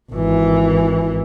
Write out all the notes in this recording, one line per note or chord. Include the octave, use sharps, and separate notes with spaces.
G#1 E3